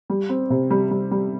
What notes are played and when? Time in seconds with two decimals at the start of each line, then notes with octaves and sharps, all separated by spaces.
0.10 G3
0.29 C4
0.50 C3
0.70 G3
0.91 G3
1.11 G3